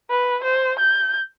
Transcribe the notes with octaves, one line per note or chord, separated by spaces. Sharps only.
B4
C5
G6